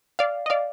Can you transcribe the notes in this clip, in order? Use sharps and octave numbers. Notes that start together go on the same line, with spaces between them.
D5 F5
D#5
D5 F5